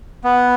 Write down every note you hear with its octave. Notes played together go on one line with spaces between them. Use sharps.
B3